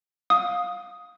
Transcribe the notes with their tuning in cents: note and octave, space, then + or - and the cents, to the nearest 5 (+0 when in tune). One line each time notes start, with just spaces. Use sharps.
F5 +20 D#6 +5